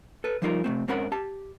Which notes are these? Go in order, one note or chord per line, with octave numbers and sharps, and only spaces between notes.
A4 B4
F3 G3 D#4 F4 G#4 A#4
C3 A3 C4
G#2 C4 C#4 A#4 F#5 B5
G4 A5